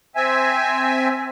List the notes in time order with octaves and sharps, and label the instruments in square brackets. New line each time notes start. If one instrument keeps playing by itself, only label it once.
[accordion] C4 E5 G#5